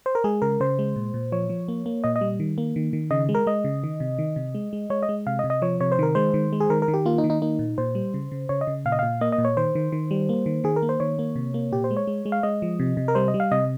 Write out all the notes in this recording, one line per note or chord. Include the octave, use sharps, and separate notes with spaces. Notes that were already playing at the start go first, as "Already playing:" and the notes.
C5
A#4
G#3 G#4
C#3 A#4
C#3 C5
G#3
A#2
A#2
F3 C#5
F3
A#3
A#3
A#2 D#5
D#5
G3
D#3
A#3
D#3
D#3
C#3 D#5
G#3
A#4
G#3 D#5
C#3
D#3
C3
D#3
C3
G#3
G#3
G#3 C#5
D#5
G#3
C3 F5
D#5
C3
D#5
F3 C#5
C3 C#5
C5
D#3 A#4
G#3 C5
D#3
G#3
G#4
D#3 A#4
A#4
D#3
G4
A#3 F4
D#4
D#3
D#4
A#3 D#4
A#2
A#2 C5
G3
C#3
C#3
C#3 C#5
D#5
C#3
A#2 F5
D#5
A#2 F5
A#3 D#5
D#5
A#2
C#5
D#3 C5
D#3
D#3
G3
A#3
D#3
D#3 G#4
A#4
A#3
C5
D#3 C#5
A#3
C3
A#3
A#2 G4
C5
G#3
C#5
G#3
G#3
F5
G#3 D#5
F3
C3
C3
A#4
G3 C5
D#5
G3
F5
C3 D#5